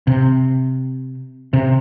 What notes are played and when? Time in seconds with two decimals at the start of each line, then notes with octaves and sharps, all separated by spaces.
0.07 C3
1.53 C3